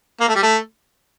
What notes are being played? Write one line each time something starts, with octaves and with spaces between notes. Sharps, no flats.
A#3
A3
G3
A3